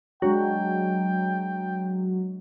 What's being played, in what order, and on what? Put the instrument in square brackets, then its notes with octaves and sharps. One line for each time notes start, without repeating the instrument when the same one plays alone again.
[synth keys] F#3 [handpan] G#3 D4 F#4 [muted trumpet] G5